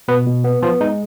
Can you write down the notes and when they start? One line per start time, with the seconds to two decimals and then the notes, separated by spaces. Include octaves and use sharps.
0.08 B2 B3 B4
0.27 B2
0.44 B3
0.62 F3 B3 F4
0.81 G#3 D#4